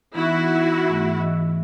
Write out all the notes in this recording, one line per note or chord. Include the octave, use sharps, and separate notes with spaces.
E3 B3 D#4 E4 F#4
G#2 E3 A3
E3 D#5 E6